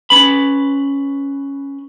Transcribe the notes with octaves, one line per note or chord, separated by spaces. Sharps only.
C#4 B4 B5